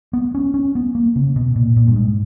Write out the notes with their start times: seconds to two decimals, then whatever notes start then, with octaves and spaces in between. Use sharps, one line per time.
0.13 B3
0.34 C#4
0.54 C#4
0.75 B3
0.95 A#3
1.16 C#3
1.36 B2
1.56 A#2
1.76 A#2
1.87 G2
1.96 G#2